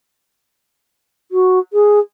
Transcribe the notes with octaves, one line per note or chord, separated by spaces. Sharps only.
F#4
G#4